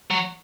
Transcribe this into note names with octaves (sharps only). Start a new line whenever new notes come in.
F#3